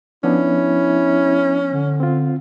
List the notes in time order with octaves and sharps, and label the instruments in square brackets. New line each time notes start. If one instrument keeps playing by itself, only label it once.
[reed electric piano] F3 B3 D4 [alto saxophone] C#4 [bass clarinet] E4
[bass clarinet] D3
[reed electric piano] C4 F4